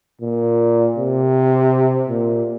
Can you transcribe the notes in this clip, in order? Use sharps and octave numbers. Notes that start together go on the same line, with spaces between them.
A#2
C3
A#2